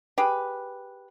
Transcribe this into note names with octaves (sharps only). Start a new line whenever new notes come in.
G4 G#4 B4